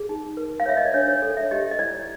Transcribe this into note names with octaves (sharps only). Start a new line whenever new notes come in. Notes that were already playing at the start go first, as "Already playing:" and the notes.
Already playing: G#4
D#4
A#4
F5
C#5 E5
D#5
D5
D4 C#5
C#5
A4
E5
G4 D#5
D#5
E4 D5